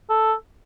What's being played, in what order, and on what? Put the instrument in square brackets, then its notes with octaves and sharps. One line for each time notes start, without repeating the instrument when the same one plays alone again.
[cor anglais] A4